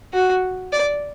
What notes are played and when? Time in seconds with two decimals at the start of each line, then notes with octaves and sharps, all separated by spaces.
0.13 F#4
0.72 D5